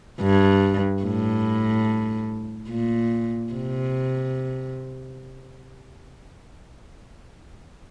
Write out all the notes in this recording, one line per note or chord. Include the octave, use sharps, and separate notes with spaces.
G2
A2
A#2
C3